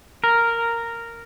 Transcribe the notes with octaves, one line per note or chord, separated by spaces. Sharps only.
A#4